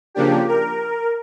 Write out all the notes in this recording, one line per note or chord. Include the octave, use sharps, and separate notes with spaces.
C#3 F3 A#3 D4 G4
A#4